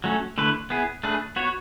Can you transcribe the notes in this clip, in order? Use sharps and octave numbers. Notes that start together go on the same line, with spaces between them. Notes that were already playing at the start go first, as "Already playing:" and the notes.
F#3 A3 C#4
D3 A3 E4 B4
B3 E4 G#4
A3 D4 G#4 B4
B3 F#4 C#5